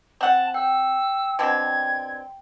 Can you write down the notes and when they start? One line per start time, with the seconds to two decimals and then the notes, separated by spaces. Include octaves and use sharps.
0.21 C4 F#5 A5
0.54 G5 E6
1.39 B2 D3 C4 G#6